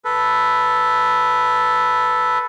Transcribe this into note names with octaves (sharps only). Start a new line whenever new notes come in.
A4 B4